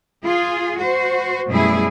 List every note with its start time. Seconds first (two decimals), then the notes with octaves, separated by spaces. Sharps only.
0.25 F4 G#4
0.80 F#4 C5
1.48 F#2 B2 G3 A3 E4 G#4